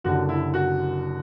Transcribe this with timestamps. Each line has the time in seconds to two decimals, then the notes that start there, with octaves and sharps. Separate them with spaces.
0.04 F#1 F#2 D3 G3 F#4
0.29 E4
0.54 F#4